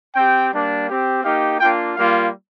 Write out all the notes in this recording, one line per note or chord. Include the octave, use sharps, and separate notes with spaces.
C4 G4 G5
G3 A#3 D4
C4 G4
A#3 D#4 G4 F5
A#3 D4 F4 G5
G3 A#3 F4 F5